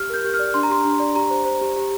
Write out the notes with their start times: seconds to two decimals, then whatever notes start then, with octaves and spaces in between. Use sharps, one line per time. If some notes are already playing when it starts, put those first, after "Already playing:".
Already playing: G4 F6
0.10 A#4 G6
0.24 G4
0.34 F6
0.39 D5
0.54 D4 C6
0.63 A#5
0.70 G4 C6
0.85 D4
1.00 D5
1.15 G4 A#5
1.30 C5
1.45 C5
1.61 G4
1.76 G4